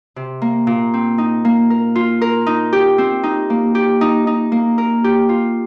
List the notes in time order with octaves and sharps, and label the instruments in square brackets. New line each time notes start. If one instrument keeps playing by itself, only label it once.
[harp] C3
A#3
A#2
C4
D#4
A#3
A#4
F4
A#4
D#4
G4
C4
D#4
A#3
G4
D#4
D#4
A#3
A#4
G4
F4